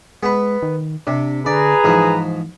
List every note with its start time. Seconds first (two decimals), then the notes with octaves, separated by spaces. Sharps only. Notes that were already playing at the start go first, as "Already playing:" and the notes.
0.23 G#3 B3 B4
0.63 D#3
1.07 C3 D4
1.46 D3 G#4 B4 D5 A#5
1.84 G#2 E3 F3